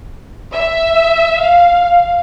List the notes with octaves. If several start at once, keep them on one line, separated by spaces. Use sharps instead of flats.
E5
F5